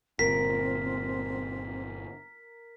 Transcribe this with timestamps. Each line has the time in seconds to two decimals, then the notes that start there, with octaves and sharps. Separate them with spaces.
0.19 G1 A#2 C4 A#4 B6